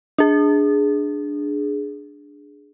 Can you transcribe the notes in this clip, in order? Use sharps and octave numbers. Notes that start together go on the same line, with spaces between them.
D4 G#4